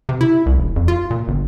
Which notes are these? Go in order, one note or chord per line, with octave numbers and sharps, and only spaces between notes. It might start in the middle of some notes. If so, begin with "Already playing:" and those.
C3
E4
C2
E1
F2
F4
A#2
G1